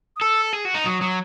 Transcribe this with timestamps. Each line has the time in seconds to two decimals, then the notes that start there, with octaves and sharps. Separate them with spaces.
0.16 D#6
0.21 A4 E6
0.53 G#4
0.65 F#4
0.74 D#4
0.85 F#3 D#6
1.02 F#3